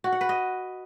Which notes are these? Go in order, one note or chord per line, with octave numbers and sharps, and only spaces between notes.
F#4
F#5
B4
D#5